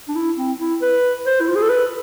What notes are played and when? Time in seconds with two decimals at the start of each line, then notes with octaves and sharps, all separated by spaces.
0.08 D4
0.15 E4
0.37 C4
0.59 E4
0.82 B4
1.26 C5
1.41 E4
1.48 F4
1.55 G#4
1.62 A4
1.69 B4